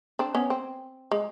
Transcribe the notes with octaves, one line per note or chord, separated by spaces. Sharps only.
C4 D4
B3 C#4
C4
G#3